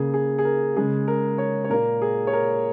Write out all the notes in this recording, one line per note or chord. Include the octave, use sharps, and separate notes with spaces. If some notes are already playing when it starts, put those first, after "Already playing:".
Already playing: C#3 A#3 G#4
G#4
G#4
A#4
C#3 G#3 G#4
A#4
C#5
C#5
A#2 A#3 A#4
G#4
C#5
A#4